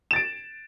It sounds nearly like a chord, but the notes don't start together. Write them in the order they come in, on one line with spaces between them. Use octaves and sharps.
E7 A6 D7